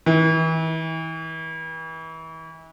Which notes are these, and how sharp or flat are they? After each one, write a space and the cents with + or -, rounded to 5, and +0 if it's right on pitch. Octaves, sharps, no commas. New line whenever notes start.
E3 -35